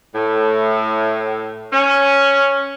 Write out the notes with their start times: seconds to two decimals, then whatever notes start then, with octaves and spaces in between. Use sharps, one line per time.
0.14 A2
1.72 C#4